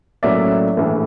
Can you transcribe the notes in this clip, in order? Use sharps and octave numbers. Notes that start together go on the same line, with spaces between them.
A2 F#3 A#3 C#4 D5 E5
A#1 A2 E3